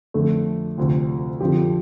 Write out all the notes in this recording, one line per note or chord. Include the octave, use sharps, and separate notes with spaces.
F2 D3 A3
D2 C3 F3 C4
F2 D3 F3 C4 G4